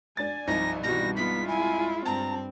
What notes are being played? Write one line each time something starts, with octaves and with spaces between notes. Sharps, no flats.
D4 G#5 A6
C2 G2 F3 D#4 A#6
B2 E3 G3 F#4 A#6
G#3 B3 F4 B6
E4 G#5
G2 C4 A5 A#5